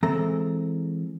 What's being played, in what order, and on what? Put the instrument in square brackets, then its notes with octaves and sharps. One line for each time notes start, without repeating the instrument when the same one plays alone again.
[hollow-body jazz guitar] E3 G#3 C4 A4 A#5